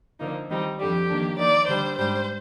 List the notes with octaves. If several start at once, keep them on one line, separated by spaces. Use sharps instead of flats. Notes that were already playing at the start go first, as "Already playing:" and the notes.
D3 F3 A#3 D#4
D#3 G3 C4 D#4
F2 D3 G3 G4
D#3 A#3 D4
D#3 A#3 D#4 D5
D3 G3 D4 C5
G#2 G3 D4 C5